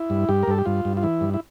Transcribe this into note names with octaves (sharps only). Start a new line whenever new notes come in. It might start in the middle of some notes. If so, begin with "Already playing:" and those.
Already playing: E4
G2
G2 G4
A#4
G2 A4
G4
G2 F4
G2
F4
E3 E4
G2
E4